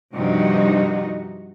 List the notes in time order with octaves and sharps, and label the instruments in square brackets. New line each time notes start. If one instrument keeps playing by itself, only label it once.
[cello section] G2 C3 F3 D#4 F#4